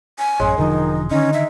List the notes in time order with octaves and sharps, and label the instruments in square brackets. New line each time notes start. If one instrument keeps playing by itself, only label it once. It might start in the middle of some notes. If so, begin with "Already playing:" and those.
[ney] G#5
[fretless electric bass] A1 F#2 [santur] G#3 [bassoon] C#4
[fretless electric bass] E1 D3 F3 [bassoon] D#3 [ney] D#4
[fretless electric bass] D3 D#3 [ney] C#4 [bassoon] D#4
[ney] E5